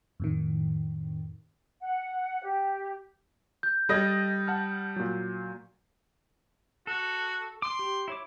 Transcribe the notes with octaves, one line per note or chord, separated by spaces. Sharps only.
F2 A2 D#3
F#5
G4
G6
G3 A4 D#5 D#6 G#6 A#6
F#5 A5 F6
A#2 F#3
F#4 A4
C6 D6
G4
E4 C#5 D6